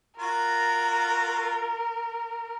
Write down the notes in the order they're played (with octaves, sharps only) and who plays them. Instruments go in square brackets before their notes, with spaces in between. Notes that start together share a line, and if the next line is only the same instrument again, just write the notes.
[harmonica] F4 F#4 [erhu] A#4